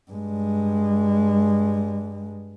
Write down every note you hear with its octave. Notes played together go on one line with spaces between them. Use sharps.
G2 G#3